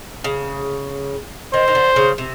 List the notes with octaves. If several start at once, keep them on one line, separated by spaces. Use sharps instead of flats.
C#3
D#3 C5
D#3
D3
C#3
C3